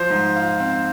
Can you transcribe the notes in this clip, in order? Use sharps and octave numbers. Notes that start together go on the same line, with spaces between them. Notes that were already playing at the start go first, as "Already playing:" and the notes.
Already playing: F3 C5
G#2
F4
C4